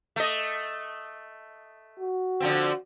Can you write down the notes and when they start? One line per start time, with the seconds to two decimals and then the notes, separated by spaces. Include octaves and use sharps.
0.16 A3 D#5
1.99 F#4
2.40 D3 F3 C4